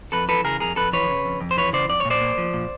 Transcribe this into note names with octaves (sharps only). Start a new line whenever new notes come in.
F2 A4 B4
E3 A4 B4
C#3 G#4 A#4
F2 G#4 A#4
F2 A4 B4
E3 B4 C#5
C#3
F2
F2
C5
E3 B4 C#5
C#3 C5 D5
F2 D5
A#2 C#5
C5 D5
A#3
F3
A#2